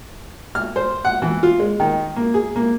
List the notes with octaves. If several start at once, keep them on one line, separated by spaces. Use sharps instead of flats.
F6
C5
F#5
E3
F4
G#3
D#3
A#3
G#4
A#3